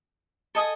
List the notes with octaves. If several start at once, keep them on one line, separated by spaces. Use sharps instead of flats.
A4 D#5 G#5 D#6